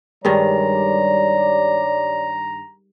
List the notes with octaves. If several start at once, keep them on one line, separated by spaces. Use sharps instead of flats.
G2 D#3 G3 G#3 C#5 D5 A#5